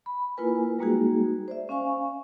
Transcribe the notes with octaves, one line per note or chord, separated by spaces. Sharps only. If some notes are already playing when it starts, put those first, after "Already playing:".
B5
A#3 E4 F4 A#4 B4 G#5
G3 G#3 A#3 D#4 F#4 G#4
C5 D5 E5
C#4 F5 G#5 C#6